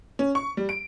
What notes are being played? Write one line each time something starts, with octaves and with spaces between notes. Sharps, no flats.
C#4
C#6
G3
D7